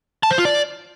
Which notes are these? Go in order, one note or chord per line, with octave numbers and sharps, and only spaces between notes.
A5
C5
F4
D5